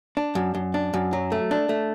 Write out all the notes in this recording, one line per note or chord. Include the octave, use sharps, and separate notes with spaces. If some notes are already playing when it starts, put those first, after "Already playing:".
D4
F#2
F#2
D4
F#2
F#3
A3
D4
A3